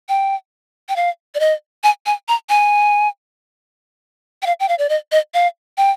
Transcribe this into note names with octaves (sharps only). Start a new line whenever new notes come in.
G5
G5
F5
D5
D#5
G#5
G#5
A#5
G#5
G5
F5
G5
F5
D5
D#5
D#5
F5
G5